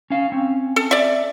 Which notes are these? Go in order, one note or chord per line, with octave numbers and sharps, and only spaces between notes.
C#4 F5
C4 C#4
A4
D5 E5